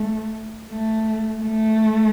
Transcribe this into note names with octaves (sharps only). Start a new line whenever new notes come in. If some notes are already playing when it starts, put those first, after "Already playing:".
Already playing: A3
A3
A3